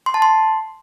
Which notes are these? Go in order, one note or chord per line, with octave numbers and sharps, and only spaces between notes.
C6
A5
C6